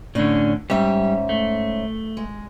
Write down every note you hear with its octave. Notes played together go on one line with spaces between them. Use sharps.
A2 D3 C#4 D4
G#2 G3 C#4 G4 E5
A3
G#3